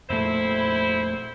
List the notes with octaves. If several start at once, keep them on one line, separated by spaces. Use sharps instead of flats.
F2 A#2 A3 E4 C5